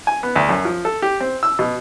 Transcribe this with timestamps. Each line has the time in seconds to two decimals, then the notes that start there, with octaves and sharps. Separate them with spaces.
0.07 G#5
0.23 B3
0.36 D2
0.49 F#2
0.65 F3
0.85 A4
1.02 G4
1.20 C4
1.43 E6
1.59 B2